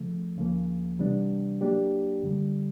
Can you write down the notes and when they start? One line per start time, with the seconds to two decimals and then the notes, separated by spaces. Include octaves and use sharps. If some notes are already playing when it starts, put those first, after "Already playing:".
Already playing: C#3 F3 A3
0.36 D2 C#3 F3 A#3
0.99 C3 E3 G3 B3 D4
1.61 F#3 A#3 D4 G4
2.23 F#2 D3 G3